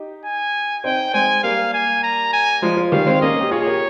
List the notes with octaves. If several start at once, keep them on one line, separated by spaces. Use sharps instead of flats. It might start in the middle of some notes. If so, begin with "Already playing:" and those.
Already playing: D#4 G4
G#5
C4 D#4 G5
G#3 C4 G#5
G3 A#3 F5
G#5
A#5
G#5
F3 G#3
F3
D#3 G3 F5
G#3 C4
A#3 C#4 D#5
G4
F4 G#4 C#5
G#4
G4 A#4